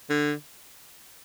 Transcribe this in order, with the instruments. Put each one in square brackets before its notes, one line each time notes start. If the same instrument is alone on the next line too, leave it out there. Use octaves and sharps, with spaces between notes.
[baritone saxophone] D3